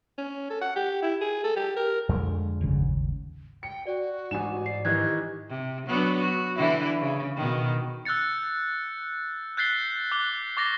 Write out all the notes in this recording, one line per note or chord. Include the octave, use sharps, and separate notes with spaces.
C#4
A4
F#5
G4
E4
G#4
A4
G4
A#4
F2 D3 G#3
D#1 G#1 C#3
G5 C#7
F#4 D5
A1 G#2 G#5 E7
D5 C7
D#3 E3 G4 D#5 F#6 G#6
C3
F#3 B3 D4
F#4
D3 E3 E4
C#3
B2 D#3
E6 F#6 G6 A6 C#7
F#6 G6 A6 B6 C7 G7
D6 F#6 G7
C#6 D6 A6 A#6 C7 G7